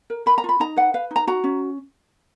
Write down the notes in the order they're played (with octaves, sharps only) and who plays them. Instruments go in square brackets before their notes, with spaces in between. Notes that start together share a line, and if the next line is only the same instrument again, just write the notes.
[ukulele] A#4
A#4 B5
A#5
F4 B5
D#4 A#5
B4 F#5
B4 F5
D#4
A#5
F#4 A#5
C#4